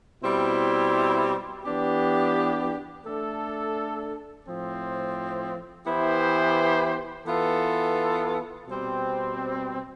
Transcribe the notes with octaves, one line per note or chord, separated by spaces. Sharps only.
B2 G3 C4 E4
E3 B3 D4 G4
A3 D4 A4
A2 F3 C4
E3 B3 E4 G4 C5
E3 B3 F4 A4
B2 G3 C4